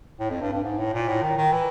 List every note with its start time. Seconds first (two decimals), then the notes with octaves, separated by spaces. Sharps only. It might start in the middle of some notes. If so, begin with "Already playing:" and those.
0.19 A2
0.30 F2
0.42 G2
0.53 G2
0.64 G#2
0.79 A2
0.93 A#2
1.08 A2
1.22 D#3
1.38 D#3
1.52 E3